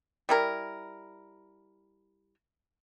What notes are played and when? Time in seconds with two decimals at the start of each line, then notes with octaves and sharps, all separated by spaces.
0.29 G3 E4 A#4